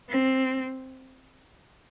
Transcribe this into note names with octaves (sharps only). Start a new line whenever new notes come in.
C4